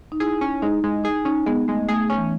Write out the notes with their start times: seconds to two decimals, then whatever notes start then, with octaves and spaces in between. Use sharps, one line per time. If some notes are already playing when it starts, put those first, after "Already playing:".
0.12 D#4
0.20 E4 G#4
0.41 C#4
0.62 G#3 D#4
0.84 G#3
1.04 D#4 G#4
1.25 C#4 D#4
1.46 G#3 B3
1.68 G#3 A3
1.88 A3 G#4
2.10 C#4
2.17 E3